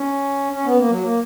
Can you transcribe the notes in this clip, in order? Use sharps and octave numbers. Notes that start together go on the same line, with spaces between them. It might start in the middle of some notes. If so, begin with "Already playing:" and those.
Already playing: C#4
C#4
B3
A#3
F#3
A#3